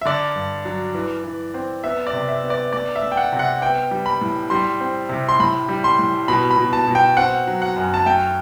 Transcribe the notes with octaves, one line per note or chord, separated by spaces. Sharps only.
E5
D3 D5
G2
F#3
E3
E3
C4
B3 E5
D5
C3
E5
B3
D5
A3 D5
E5
A3
G5
F#5
C3
F#5
B3 G5
G3
B5
A2
G3 C6
C4
C3
C6
A2 B5
G3
C6
A2
B2 B5
B5
B2
A5
B2
G5
C4 F#5
F#3
F#5
F#2
A5
A3 G5